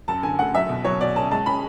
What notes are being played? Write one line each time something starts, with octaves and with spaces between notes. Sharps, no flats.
F#2 A5
D3 G#5
A3 F#5
F#3 E5
B2
F#3 C#5
B2 D5
C#4 A5
G#3 A5
C#4 B5